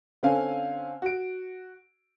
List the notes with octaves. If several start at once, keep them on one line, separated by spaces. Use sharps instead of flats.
D3 C4 C#4 F5 G#5
F#4 D7